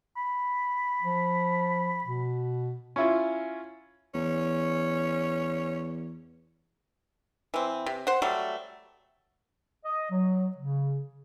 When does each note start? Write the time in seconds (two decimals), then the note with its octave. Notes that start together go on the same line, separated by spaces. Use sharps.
0.17 B5
1.02 F3
2.04 B2
2.96 C#4 E4 F4
4.14 E2 C#4
7.54 E3 C4
7.86 C3
8.07 C5 F#5
8.22 F#3 G3 A3
9.85 D#5
10.11 F#3
10.56 C#3